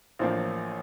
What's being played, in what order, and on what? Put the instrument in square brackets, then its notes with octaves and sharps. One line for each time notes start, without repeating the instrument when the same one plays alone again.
[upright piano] A1 A2 F3 A#3 D4 C5